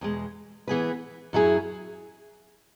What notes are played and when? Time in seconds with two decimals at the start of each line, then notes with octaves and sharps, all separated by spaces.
0.01 E2 B2 G#3
0.68 E3 B3 G#4 B4
1.33 F#2 F#3 E4 G#4